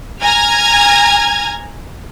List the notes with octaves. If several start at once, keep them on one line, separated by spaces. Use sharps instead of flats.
G#5 A#5 F6 G#6